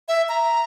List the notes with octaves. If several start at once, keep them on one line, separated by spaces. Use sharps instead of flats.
E5
A#5